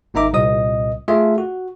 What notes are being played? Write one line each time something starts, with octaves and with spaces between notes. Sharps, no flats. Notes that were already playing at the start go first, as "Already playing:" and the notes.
G#1 A#3 D#4 E5 A#5 D6
C2 A#2 D#5 D#6
A3 F4 G#4 E5
F#4